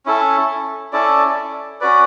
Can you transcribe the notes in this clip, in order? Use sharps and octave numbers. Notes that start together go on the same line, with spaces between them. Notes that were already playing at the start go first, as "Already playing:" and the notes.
C#4 E4 A4
C#4 E4 A4 D5
C#4 F#4 B4 D5